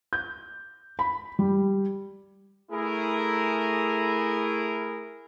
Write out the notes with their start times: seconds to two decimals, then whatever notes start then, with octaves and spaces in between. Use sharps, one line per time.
0.13 G6
0.99 B5
1.39 G3
2.72 A3 E4 G#4 A#4